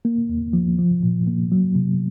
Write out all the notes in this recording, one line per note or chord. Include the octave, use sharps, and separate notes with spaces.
A#3
D#2
F3
F3
A#2
A#3
F#3
C3